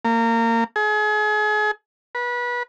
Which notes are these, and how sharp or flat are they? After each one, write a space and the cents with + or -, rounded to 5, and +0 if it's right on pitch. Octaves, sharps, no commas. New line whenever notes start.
A#3 -25
G#4 +35
B4 -25